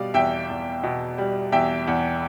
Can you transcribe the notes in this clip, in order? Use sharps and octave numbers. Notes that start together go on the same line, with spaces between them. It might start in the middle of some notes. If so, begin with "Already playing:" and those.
Already playing: B2 G3 D5 F5
E2 E5 G5
E2
B2
G3
E2 E5 G5
E2